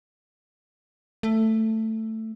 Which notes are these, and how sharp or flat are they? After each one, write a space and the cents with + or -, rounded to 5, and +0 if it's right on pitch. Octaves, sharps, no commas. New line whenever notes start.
A3 +10